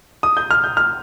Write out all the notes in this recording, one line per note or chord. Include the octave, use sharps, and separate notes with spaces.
D#6
G6
F6
G6
F6